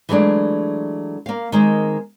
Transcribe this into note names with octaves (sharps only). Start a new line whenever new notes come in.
E3 F#3 G#3 A3 D4
A#3 F5
D#3 G#3 A#3 C4